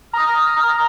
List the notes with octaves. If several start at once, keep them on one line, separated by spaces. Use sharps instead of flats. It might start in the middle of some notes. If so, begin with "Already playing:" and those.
A#5 D#6 F6